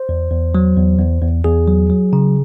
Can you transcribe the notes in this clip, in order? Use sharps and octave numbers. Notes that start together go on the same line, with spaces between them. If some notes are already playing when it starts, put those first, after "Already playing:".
Already playing: C5
E2
E2
F#3
E2
E2
E2
E2 G#4
F#3
F#3
C#3